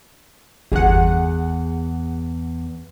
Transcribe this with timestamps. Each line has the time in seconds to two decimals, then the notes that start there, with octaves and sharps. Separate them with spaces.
0.72 G1 E2 G#4 F#5